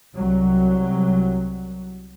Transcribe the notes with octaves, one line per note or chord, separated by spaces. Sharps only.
C2 F#3